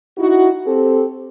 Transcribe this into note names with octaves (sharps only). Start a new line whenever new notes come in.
D#4 E4 F#4
C4 G4 A4